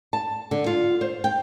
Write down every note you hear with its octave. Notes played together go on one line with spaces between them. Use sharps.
A5
D3
F4
C5
G5